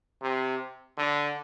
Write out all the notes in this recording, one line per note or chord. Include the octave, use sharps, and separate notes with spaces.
C3
D3